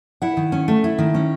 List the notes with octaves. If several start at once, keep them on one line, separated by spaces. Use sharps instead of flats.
E4 F#5
D#3
C#4
A3
E4
D#3
C#4